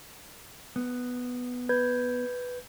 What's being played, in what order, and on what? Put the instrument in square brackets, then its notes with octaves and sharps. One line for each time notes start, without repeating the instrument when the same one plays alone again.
[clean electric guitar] B3
[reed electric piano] B4 G6 G#6